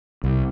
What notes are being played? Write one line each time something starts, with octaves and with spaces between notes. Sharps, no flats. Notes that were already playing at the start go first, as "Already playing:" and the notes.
C2